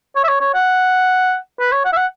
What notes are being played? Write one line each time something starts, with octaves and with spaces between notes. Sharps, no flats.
C#5
E5
C#5
C#5
F#5
B4
C#5
F#5
E5
F#5